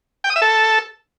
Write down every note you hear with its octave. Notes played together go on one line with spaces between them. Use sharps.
G5
D#6
E5
A4